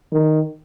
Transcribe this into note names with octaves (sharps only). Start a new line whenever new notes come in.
D#3